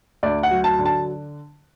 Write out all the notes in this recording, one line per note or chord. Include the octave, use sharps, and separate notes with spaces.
D2 D5
F#5
F#3
A5
D3
A5